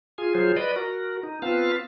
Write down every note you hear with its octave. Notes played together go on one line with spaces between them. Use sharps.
F4 G#4 G#5
F#3 F4 G#4 C5
B4 D5 D#5
F#4 A#4
D#4
B3 C4 F4 B4 F5 A5